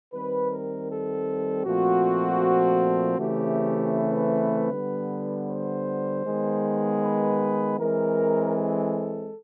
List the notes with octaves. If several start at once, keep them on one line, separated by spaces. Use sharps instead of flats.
D#3 G3 C4 B4
A#4
A4
A#2 F3 A3 C4 F#4
C#3 E3 A3 C4 G4
B4
D3 G3 B3
C5
D#3 G#3 B3
B4
E3 G#3 C4 A#4
A4